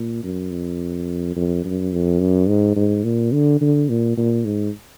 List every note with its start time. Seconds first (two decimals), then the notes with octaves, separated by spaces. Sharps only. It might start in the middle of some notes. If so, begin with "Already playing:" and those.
Already playing: A#2
0.23 F#2
0.51 F2
1.36 F2
1.64 F#2
1.93 F2
2.19 F#2
2.48 G#2
2.76 G#2
3.04 A#2
3.32 D3
3.61 D3
3.89 A#2
4.17 A#2
4.45 G#2